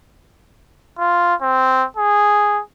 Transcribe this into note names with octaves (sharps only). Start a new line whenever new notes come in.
F4
C4
G#4